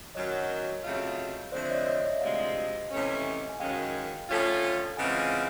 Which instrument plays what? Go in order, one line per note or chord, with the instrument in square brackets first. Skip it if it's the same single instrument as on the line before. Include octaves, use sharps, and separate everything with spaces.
[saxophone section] F#2 D#3 F#3 [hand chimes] C#5 D#5
[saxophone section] C#3 F#3 A3 C4 F4
[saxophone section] D3 F3 A3 C4 [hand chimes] C5 D5
[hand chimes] C#5 D#5
C#5 D#5
D5 E5
[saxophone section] D2 C3 F3 G#3 C4 [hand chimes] D#5 F5
[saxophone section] C3 E3 A3 C#4
[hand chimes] G#5
[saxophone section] F#2 D#3 G#3 C#4 [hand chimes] F5 G5
[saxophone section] D3 F3 A3 C#4 F4
[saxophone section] C#3 E3 G#3 C4 F4 [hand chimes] F#5 G#5